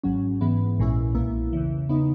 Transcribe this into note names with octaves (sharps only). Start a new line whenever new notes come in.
G#1 G#2 F#3 C#4
G#2 E3 B3
A#1 A#2 G#3 C#4 E4
B1 B2 A#3 E4
E2 C#3 E3
C#3 E3 B3 D#4